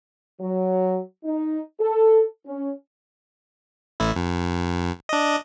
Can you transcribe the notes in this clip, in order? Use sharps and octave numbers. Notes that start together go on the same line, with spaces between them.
F#3
D#4
A4
C#4
A1 A2 E4
F2
D4 D#5